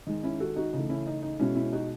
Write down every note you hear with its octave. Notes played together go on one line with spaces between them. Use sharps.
D#3 G#3 D#4
C#4 E4
F#4 A4
D#4 F#4
C#3 E3 A3 D#4
C#4 E4
D#4
D#4
B2 G#3 C#4 E4
C#4 E4
D#4 F#4